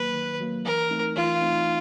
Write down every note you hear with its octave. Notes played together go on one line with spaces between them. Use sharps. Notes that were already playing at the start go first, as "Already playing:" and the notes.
Already playing: D#3 F#3 A#3 B4
D#3
F#3 A#3
E3 A#4
A3 C4 D#4
E3 F4
A3 C4 D#4